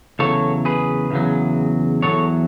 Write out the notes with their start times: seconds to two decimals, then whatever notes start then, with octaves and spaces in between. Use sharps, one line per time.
0.19 E2 C#3 F#3 A4 C#5
0.65 G#4 B4
1.11 E2 C#3 F#3
2.02 C#3 F#3 A4 C#5
2.07 E2